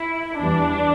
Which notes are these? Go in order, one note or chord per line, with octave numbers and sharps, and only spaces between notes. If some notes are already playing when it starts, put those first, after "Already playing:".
Already playing: E4
E2 E3 G3 D4